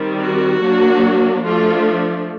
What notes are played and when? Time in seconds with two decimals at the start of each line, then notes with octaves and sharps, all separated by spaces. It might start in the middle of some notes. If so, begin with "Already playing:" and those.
Already playing: D#3 G3 C4
0.21 F#4
0.62 F#3 A#3 D4
1.45 F3 A3 D4 F4